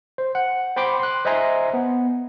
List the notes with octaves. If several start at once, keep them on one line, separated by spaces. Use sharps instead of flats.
C5
F#5
C5 G5 B5 C6 D6
C6 F#6
C5 D#5 E5 G#5 A#5 C6
B3